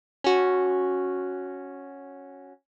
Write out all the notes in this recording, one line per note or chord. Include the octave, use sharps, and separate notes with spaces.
C#4 F#4